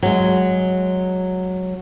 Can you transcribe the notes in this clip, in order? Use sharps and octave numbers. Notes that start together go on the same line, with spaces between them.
F#3 G#3